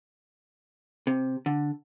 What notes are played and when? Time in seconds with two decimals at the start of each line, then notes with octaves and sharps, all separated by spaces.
1.07 C3
1.46 D3